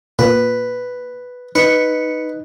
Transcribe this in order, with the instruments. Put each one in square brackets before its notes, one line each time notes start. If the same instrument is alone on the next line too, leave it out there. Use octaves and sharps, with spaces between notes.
[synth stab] A#2 [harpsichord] B4
[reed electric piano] D#4 [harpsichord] B4 [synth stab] C#7